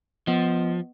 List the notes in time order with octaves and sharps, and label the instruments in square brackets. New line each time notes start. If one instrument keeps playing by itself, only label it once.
[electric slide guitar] F3 [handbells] B3 D#5